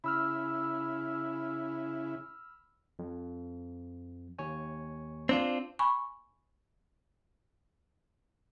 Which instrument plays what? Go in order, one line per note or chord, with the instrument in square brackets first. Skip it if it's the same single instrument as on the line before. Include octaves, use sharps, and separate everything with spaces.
[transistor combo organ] C#3 E4 [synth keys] B5 E6 F6
[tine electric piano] F2
D#2 C#5 G#5
[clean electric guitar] C4 D4 F4
[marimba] G#5 B5 C#6